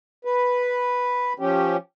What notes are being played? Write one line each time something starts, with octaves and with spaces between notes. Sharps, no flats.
B4
F3 C#4 G4